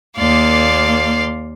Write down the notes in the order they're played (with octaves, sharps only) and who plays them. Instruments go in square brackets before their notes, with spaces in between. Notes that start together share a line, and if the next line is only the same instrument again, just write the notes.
[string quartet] D#2 A#3 D5 F5 C6